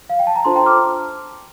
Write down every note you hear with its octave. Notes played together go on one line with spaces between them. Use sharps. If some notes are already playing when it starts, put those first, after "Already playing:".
F5
G5
A5
A#5
D4 F4 A4 C5 A5 C6
G5 A#5
D6 F6